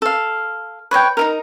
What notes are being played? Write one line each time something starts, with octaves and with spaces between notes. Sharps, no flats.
A4 F5
B4 C#5 D#5 G5
D#4 E4 A#4